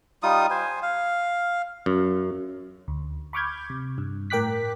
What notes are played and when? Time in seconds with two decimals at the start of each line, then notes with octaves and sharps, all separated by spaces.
0.23 G3 D#4 F4 D#6
0.50 C5 G#5
0.82 F5
1.86 F#2
2.88 D2
3.33 B5 C#6 D6 F6 G6 G#6
3.70 C3
3.98 G2
4.30 A2 A#4 G5 D6 F#6 B6